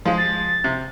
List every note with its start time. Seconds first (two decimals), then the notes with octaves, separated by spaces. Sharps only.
0.06 F3 G#3
0.18 A6
0.64 C3